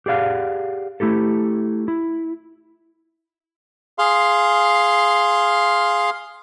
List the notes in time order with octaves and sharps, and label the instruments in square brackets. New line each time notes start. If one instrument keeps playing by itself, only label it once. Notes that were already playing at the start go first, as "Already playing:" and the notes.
[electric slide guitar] G4 G#4 D5 F5 F#5
A3 E4 G4 A4
E4
[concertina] G#4 F5 C6